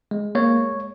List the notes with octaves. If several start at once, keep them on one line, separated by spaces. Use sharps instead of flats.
G#3
A#3 C#5